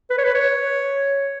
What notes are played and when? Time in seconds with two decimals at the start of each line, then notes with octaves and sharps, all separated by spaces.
0.10 B4
0.18 C#5
0.24 B4
0.34 C#5